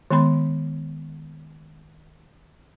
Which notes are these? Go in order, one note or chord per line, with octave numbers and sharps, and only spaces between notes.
D#3 G#3 B3 B5 C6